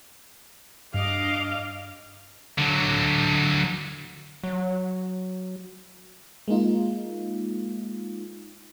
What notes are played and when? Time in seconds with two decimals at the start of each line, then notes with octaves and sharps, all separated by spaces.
0.94 G2 D4 D#5 F5 D6
2.58 D3 F#3
4.44 F#3
6.48 G#3 A#3 D#4 F4